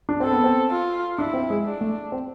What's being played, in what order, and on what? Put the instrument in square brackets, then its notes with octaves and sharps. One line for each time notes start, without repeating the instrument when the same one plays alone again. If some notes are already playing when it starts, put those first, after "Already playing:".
[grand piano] D4
[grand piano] C4 [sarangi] A4
[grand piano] B3
C4
[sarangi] F4
[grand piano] D4 [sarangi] E4
[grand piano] C4
G#3
[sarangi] D4
[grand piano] A3
C4